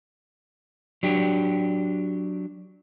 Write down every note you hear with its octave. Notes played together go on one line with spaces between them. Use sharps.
F#3 D4 G4